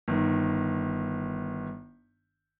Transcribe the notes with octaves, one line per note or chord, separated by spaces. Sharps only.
G1 D#3